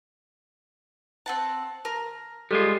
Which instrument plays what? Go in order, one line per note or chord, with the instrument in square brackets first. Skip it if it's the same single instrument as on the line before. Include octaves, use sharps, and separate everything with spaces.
[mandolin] C4 F#5 A5
[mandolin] A#4 [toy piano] A5
[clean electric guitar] G3 G#3 F4 [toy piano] G4 A4 C5